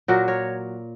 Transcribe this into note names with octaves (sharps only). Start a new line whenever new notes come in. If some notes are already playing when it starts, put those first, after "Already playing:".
A#2 F#3 F#4 A#4
A#4 C#5